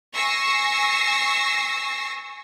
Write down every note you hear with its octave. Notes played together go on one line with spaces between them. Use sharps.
G#5 C#6 E6 A#6 C7